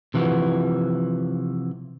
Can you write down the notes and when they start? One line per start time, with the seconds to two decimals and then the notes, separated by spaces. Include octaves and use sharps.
0.14 C3 E3 F3 F#4